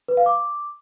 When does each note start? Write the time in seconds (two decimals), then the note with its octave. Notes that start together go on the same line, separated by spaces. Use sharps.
0.08 B4
0.17 F5
0.26 D6